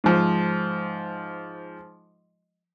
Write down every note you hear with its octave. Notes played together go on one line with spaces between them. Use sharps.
G#2 F3